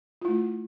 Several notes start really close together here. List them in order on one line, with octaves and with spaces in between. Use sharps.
F4 E4 A3